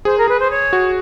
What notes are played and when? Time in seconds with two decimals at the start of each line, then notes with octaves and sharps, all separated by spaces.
0.05 G#4 C5
0.18 A#4
0.28 G#4 B4
0.39 C5
0.50 C#5
0.73 F#4